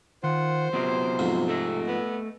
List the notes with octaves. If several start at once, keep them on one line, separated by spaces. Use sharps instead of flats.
D#3 F4 C5 F#5
C3 F#3 B3 F4
F2 G#2 C4
A3 A4 D#5
B3